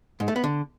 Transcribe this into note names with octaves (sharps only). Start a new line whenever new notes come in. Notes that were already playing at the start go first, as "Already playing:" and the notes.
G#2
A3
B3
D3